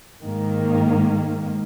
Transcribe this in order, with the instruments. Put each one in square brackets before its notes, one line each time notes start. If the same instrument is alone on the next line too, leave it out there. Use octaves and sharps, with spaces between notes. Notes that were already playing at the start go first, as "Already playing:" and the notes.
[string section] G#2 D#3 A#3